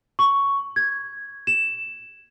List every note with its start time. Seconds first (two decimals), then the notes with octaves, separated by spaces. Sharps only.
0.19 C#6
0.76 G#6
1.47 E7